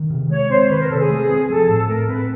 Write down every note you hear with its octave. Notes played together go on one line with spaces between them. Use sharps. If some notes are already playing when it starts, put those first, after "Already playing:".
Already playing: D#3
C3
G#3 C#5
C4 C5
D#3 B4
A#4
C3 A4
G#4
A3
C4
F3 A4
A2
A3 A#4
C4 B4